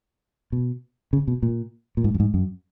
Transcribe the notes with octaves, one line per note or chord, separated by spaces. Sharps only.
B2
C#3
B2
A#2
A#2
G#2
F#2
G#2
F#2